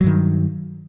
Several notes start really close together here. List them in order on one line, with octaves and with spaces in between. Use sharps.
F#3 G2 D#3